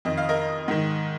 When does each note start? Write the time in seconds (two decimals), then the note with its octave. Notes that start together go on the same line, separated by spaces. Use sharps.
0.05 F2 D#3 D#5
0.17 F5
0.29 A#4 D#5
0.68 G#2 D#3